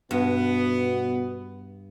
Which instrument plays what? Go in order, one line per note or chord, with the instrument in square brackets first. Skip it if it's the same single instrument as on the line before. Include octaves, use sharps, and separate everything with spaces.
[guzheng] G2 [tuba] B2 [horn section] B3